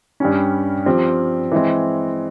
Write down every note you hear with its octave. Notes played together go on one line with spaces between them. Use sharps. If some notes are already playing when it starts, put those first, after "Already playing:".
G2 G3 C#4
F3 C4 G4
E3 G#3 C4